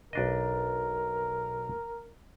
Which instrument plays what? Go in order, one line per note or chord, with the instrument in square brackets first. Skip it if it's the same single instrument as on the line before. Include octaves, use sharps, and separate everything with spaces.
[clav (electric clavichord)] B1 D4 D#5 [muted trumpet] A#4